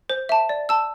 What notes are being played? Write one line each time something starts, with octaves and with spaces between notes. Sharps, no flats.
C5
E5 A5
D5
A5 E6